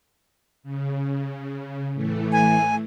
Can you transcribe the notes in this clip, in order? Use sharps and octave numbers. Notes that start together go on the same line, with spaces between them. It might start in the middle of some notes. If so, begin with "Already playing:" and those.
C#3
A2 E3 A3
G#5